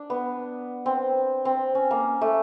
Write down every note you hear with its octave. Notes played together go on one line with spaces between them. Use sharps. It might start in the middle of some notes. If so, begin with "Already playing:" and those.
Already playing: D4
B3
C4
C4
C#4
A#3
A3